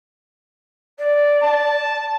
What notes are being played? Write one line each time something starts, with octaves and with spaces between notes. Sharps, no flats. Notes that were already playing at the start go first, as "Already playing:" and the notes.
D5
A5